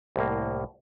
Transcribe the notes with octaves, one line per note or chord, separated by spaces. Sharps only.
C2 A2 A#3